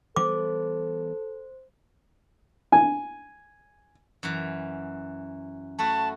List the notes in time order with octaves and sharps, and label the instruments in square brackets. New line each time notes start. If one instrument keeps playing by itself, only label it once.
[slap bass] E3 G3 B3 [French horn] A4 [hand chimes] C5 [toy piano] D6
[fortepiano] G#5
[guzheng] F#2 E3
[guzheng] A3 E4 F#4 [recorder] A5